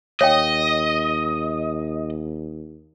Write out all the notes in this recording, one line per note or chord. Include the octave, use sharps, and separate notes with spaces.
D#2 C#5 D#5 F5 G5